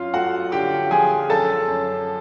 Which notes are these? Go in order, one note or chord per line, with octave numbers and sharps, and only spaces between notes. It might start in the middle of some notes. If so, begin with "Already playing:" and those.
Already playing: F#2 F4 F5
A3 F#4 F#5
D3 G4 G5
F3 G#4 G#5
F#2 A4 A5
F#2